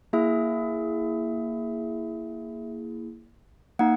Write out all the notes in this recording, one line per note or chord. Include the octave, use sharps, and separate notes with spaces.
A#3 E4 G#4 E5
A#3 D#4 F#5